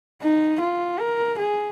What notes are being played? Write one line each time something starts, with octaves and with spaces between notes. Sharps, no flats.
D#4
F4
A#4
G#4